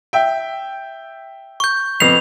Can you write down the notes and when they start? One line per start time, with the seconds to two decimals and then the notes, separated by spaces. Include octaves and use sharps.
0.13 E5 G5
1.60 C#6 G6
2.00 F2 B3 C7 F7